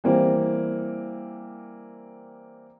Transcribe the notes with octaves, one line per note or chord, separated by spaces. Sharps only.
E3 G3 A#3 C4